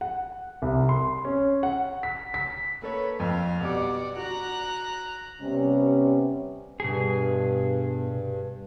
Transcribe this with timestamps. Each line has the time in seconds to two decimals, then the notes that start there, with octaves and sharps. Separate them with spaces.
0.01 F#5
0.62 C2
0.89 C6
1.25 C#4
1.63 F#5
2.03 B6
2.34 B6
2.82 A#3 A4 B4 C#5
3.20 F2 F5
3.61 B2 G3 D5 F#5 D6
4.17 F#4 A#5 F#6
5.42 C3 G3 B3 C#4
6.80 G2 B2 G#4